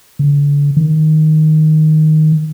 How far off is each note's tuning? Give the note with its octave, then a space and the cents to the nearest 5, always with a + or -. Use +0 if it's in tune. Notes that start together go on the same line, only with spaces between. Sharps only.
D3 -35
D#3 +0